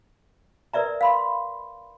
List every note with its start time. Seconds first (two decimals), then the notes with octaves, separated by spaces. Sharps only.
0.73 A#4 B4 D5 E5 A#5
1.01 F5 B5 C6